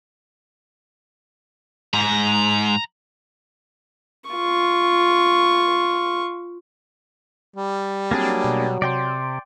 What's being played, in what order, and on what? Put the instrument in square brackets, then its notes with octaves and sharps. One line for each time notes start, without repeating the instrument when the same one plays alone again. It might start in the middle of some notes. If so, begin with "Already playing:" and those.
[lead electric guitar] G#2 [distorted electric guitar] A#5
[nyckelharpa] F4 C#6
[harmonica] G3
[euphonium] F#3 [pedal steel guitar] A#3 D4 G#4 [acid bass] C4
[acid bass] B2
[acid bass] C3 [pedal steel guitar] D5 G5 C6